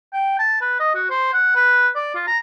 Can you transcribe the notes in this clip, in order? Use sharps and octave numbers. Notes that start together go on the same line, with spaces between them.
G5
A5
B4
D#5
F#4
C5
F#5
B4
D5
F4
A#5